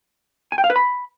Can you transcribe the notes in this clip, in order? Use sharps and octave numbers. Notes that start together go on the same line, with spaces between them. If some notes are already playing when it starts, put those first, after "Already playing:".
G#5
G5
F5
B4
B5